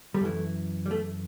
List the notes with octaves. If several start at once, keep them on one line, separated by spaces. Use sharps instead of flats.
G3
F#2 E3 A3
G3
A3